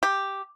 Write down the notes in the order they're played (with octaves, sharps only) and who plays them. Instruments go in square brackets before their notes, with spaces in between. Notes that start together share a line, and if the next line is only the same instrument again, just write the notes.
[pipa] G4